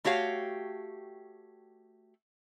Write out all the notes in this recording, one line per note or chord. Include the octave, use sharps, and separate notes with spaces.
A3 F#4 G4 C#5 F5